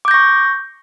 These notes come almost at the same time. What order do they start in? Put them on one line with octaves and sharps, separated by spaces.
D6 G6 A#6 C#6